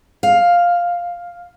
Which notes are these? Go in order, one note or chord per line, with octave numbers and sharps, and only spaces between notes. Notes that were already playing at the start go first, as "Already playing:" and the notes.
F5